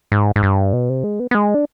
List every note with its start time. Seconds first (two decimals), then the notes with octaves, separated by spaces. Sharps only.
0.12 G#2
0.36 G#2
0.43 G2
0.73 B2
0.89 C3
1.04 G#3
1.20 B3
1.31 B3
1.35 G#3
1.54 D4